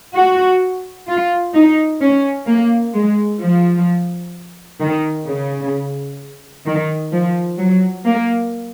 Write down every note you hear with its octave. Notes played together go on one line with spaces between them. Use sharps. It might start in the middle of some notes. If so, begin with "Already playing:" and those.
F#4
F4
D#4
C#4
A#3
G#3
F3
D#3
C#3
D#3
F3
F#3
A#3